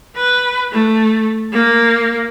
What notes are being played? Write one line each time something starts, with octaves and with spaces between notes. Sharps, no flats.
B4
A3
A#3